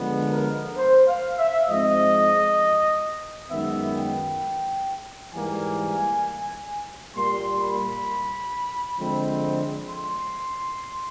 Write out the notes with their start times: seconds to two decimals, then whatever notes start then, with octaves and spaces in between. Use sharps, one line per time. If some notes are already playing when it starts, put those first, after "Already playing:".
Already playing: D3 F3 G#3 B3
0.32 A#4
0.77 C5
1.08 F5
1.38 E5
1.69 G#2 F3 G#3 C4 D#5
3.51 F#2 D#3 G#3 B3 E5
3.97 G5
5.33 G#2 E3 G3 A#3 G#5
7.16 A#2 G3 A#3 C6
7.62 B5
8.98 D3 F3 G#3 C4
9.90 C6